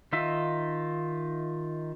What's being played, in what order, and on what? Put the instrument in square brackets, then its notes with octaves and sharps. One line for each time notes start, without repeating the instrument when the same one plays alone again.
[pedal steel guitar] D#3 D#4 F4 E5